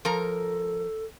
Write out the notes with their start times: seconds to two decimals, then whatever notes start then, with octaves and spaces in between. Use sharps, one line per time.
0.05 F3 A4 A#4 A#5